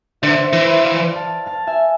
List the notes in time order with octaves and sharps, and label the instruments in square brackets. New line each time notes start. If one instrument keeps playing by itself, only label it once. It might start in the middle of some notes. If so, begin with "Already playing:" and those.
[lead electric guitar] D3 [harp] C5 E5
[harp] C5 E5
[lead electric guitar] E3
[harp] C5 E5
D5 F5
F5 A5
F5 A5
E5 G#5